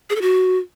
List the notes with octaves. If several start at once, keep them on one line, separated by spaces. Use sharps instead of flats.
G#4
A4
F#4